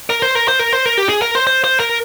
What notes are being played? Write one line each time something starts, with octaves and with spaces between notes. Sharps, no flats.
A#4
C5
A#4
C5
A#4
C5
A#4
G4
G#4
A#4
C5
C5
C5
A#4